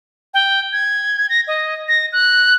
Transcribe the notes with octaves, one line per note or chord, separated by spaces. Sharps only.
G5
G#6
A#6
D#5
A#6
F#6